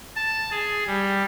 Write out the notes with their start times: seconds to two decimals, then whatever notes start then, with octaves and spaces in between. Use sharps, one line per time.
0.16 A5
0.51 G#4
0.86 G3